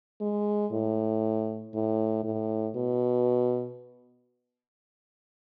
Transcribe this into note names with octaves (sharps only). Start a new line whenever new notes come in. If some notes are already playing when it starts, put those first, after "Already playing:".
G#3
A2
A2
A2
B2